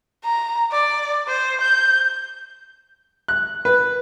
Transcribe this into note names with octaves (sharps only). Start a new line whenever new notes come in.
A#5
D5
C5
G6
F#6
B4